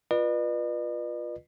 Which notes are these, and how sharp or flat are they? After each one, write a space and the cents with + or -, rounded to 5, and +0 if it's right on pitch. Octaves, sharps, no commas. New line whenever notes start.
F4 +0 B4 -20 D#5 -45